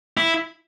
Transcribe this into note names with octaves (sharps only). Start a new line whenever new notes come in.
E4